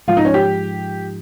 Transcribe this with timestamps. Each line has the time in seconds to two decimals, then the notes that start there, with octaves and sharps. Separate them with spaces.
0.08 G#2 F3 G#3 F4
0.17 D#4
0.25 C#4
0.34 G4